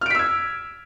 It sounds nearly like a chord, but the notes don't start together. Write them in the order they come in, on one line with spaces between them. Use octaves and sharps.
F6 D7 B6 E6 G#6